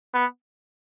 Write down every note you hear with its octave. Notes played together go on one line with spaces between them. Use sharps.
B3